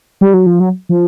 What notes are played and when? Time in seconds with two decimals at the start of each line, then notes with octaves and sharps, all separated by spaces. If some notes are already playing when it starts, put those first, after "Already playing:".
0.21 G3
0.34 F#3
0.46 F3
0.60 F#3
0.89 F3